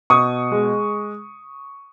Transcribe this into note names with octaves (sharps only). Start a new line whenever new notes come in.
B2 C#6 D#6
G#3